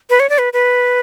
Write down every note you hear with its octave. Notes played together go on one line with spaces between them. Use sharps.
B4
C#5
D5
B4
B4